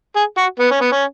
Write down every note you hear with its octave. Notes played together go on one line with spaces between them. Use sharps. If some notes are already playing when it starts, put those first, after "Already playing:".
G#4
F#4
B3
C#4
B3
C#4